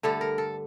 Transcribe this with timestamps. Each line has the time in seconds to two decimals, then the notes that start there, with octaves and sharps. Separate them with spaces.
0.03 G2 D3 A3 A4
0.21 A#4
0.38 A4